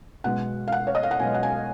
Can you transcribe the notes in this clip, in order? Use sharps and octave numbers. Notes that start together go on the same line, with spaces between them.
B1 B2 G#3 F#5
F5
F#5
C#5
D#5
F5
F#5
B1 B2 G#3 G#5
F#5
G#5